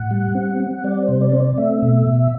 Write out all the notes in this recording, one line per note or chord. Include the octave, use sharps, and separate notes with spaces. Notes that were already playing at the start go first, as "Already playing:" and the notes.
Already playing: A2 F#5
G3
C4
C4
G3 D5
C5
C3
D5
C4 C5
D5
A3 E5
B2
B2